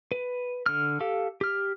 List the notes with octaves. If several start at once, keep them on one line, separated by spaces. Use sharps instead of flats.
B4
D3 F6
G4 A4 F5
G4 F6